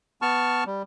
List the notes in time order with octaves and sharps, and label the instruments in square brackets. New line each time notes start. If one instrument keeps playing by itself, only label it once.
[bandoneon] B3 A5 C#6 F6
G3